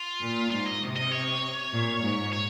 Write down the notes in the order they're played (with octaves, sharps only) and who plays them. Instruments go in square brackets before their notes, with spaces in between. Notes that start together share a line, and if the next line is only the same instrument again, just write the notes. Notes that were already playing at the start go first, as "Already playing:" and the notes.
Already playing: [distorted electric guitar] F4
[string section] A#2
[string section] G#2 [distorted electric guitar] F4
[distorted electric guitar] D#5
[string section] C3
[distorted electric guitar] D#5
C#5
[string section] A#2
G#2
[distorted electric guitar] C#5